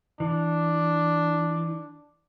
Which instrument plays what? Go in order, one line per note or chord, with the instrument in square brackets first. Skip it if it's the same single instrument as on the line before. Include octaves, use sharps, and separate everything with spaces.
[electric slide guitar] E3 [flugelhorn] D4